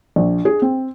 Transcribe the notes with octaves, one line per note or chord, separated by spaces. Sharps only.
A#1
G#4
C4